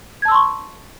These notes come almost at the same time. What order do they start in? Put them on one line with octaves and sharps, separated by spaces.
G#6 A5 E6 C6 C#6